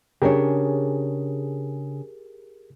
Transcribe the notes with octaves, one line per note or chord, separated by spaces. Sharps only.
C#3 D4 G4 G#4 A#4 C#5